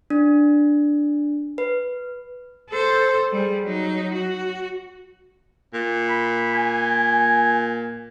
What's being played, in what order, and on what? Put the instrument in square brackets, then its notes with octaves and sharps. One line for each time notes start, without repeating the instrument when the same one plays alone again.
[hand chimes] D4
B4
[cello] A4 C5
G3 G#4
F#3 D#4
F#4
[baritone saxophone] A#2
[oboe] B5
G#5